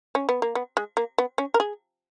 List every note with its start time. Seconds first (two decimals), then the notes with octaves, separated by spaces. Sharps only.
0.15 C#4
0.29 B3
0.42 A#3
0.55 B3
0.77 G#3
0.97 A#3
1.18 B3
1.38 C#4
1.54 A#4
1.60 G#4